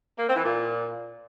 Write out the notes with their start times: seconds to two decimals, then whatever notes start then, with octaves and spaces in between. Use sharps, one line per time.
0.19 A#3
0.27 C4
0.36 E3
0.44 A#2